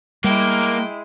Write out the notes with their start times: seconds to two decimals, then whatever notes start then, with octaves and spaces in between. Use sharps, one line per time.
0.24 G3 G#3 A#3 E4 G5